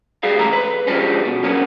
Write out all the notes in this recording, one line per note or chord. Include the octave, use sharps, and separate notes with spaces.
G3 G#4 F5
C#2 G#2 E3 A3 A#5
B4
D3 F3 G3 G#3 C#4
B2
F#2 D3 A#3 B3 C#4